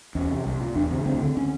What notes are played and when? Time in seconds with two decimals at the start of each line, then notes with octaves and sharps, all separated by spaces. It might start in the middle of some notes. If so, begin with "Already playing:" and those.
0.15 E2 C#4
0.30 C3
0.45 C2
0.61 A#2
0.75 E2 D4
0.91 C#3 C4
1.06 D2 C4
1.21 D3
1.37 C#4